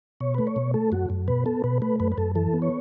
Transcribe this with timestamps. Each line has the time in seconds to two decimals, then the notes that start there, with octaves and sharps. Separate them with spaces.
0.20 B2 C#5
0.34 A3 B4
0.47 C#5
0.56 B2
0.74 A3 A4
0.92 F#2 F#4
1.10 F#2
1.28 B2 B4
1.46 B3 A4
1.64 B2 B4
1.82 A3 B4
2.00 F#2 B4
2.12 B4
2.18 F#2 A4
2.35 E3 A4
2.54 B3
2.62 C#5